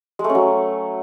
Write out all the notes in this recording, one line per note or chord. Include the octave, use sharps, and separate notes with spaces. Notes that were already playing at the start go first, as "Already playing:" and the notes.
G#3
A3
C#4
F#3